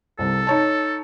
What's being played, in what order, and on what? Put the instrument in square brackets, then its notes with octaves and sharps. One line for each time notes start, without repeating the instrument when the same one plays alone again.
[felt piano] C2 C3 [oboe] A4
[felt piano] D#4 C#5 A5